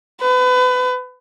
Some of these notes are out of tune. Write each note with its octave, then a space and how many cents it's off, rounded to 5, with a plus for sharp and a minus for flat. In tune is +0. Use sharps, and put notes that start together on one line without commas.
B4 +30